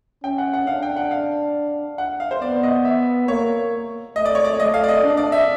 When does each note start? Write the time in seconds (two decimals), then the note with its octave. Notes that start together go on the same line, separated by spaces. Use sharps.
0.23 C#4 G5
0.38 F#5
0.53 F#5
0.67 D4 F5
0.83 G5
0.96 F#5
1.11 F5
1.98 F#5
2.20 F5
2.31 C5
2.42 B3 D5
2.63 D#5
2.85 E5
3.28 A#3 C#5
4.16 A3 D#5
4.26 D5
4.35 C#5
4.44 D5
4.60 A3 D#5
4.74 F5
4.84 D5
4.88 D#5
5.03 D4
5.17 D5
5.32 E5